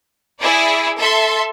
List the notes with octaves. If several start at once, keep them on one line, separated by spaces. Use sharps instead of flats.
E4 G#4 D5
A4 E5 C6